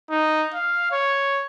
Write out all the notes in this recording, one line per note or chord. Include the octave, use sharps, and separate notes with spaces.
D#4
F5
C#5